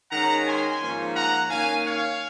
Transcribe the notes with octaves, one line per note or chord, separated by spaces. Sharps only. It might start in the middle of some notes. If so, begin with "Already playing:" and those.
D#3 G#3 C#4 F#5 A#5
G#5 C6
G#2 F3 A#3 C#4
F#5 A#5
D#3 A#3 C#4 F5 G#5
C#5 F5